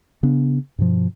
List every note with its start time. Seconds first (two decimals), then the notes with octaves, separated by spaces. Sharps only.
0.23 C#3 B3 D4
0.78 G2 B2 F3